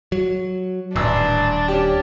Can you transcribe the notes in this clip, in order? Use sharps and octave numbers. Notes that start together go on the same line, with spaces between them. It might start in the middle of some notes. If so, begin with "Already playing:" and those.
F#3
D#1 A1 D4 E6
C#4 G4